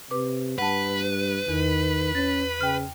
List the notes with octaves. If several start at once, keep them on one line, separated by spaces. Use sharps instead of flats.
C3 B4 D6
G2 B4 F#5 A5
E2 D#3
C#4 A6
C#3 G5 F6